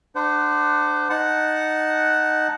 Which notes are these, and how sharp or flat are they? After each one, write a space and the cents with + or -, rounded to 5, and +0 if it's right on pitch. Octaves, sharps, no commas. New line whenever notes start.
D4 +20 C5 -25 F#5 +0
D#4 -5 F#5 +0 A5 -10